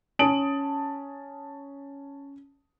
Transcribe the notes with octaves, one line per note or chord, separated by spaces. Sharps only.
C#4 A5 D#6 D7 F#7